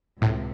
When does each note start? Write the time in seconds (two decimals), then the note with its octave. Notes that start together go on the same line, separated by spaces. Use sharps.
0.21 C#2 A2 C3